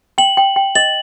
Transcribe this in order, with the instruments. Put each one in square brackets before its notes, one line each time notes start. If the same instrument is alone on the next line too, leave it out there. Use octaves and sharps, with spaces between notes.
[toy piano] G5 [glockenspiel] F#7
[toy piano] G5
G5
[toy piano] D#5 [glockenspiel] F#7